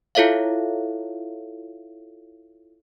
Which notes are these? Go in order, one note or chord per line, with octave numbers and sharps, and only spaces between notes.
E4 F4 A4 C#5 E5 F5